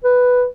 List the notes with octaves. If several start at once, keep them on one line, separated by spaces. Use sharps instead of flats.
B4